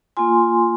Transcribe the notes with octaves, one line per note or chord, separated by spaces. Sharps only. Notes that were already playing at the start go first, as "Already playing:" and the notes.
A#3 F4 G#5 C6